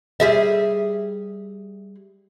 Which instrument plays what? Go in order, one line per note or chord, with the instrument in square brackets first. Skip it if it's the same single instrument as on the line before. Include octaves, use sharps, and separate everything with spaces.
[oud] G3 G#4 E5